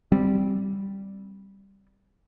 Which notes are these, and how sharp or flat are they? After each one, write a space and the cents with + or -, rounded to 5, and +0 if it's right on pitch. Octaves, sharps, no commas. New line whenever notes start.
G3 +0 C4 +0